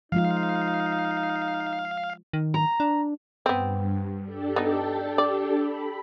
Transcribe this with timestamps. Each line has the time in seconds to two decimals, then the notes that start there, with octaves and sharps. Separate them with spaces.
0.12 F3 G#3 D#4 F4 F5
2.33 D#3
2.54 A#5
2.80 D4
3.46 G2 B3 C4
4.21 D4 G4 A4
4.56 B3 D#4
5.18 D5
5.56 B5